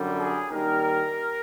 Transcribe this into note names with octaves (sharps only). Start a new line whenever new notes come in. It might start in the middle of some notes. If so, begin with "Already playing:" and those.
Already playing: F#2 D3 G3
G#4
D#2 D#3 G3 A#4